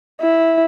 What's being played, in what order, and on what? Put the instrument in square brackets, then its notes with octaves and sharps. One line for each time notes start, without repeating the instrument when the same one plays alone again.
[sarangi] E4